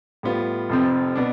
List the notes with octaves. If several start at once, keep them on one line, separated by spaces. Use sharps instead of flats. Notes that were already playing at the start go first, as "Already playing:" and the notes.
A2 G3 B3 F4
F1 F2 C3 F3 C4
B2 B3 D4